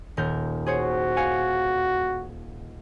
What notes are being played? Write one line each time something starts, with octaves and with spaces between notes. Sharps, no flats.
D#1 A#4 G6
F#4 G#4 C5 C#5
F5 G#5 C#7